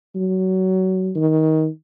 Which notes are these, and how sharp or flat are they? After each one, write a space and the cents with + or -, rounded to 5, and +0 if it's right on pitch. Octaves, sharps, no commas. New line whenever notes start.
F#3 +20
D#3 +20